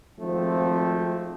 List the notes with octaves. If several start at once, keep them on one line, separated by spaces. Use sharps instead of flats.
G#1 F3 A3 C4